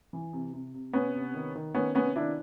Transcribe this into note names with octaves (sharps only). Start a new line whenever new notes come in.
E3
C3
C3
C3
C3 B3 C#4
C3
D#3
D#3
D#3 B3 C#4
C3 B3 C#4
D#3 D4 E4